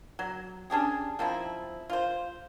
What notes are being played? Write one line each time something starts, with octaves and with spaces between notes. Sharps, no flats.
F#3
C#4 D4 G4 G#4
F3 C4 D#4 E4
F4 C5